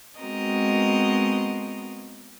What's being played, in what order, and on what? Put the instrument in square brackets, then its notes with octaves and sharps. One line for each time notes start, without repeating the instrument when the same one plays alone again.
[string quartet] G#3 B3 C4 F#4 A#4 D#5